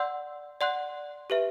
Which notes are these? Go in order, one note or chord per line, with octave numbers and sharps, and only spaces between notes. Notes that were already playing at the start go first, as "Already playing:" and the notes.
Already playing: D5 F#5 C6 E6 G6
D5 F#5 C6 F#6
G4 B4 E5